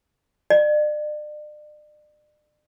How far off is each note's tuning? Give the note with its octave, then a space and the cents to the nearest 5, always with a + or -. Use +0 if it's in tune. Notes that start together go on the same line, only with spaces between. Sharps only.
D5 +40